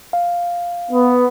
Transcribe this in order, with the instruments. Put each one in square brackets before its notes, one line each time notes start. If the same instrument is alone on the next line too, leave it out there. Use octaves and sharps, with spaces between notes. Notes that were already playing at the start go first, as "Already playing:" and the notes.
[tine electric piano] F5
[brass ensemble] B3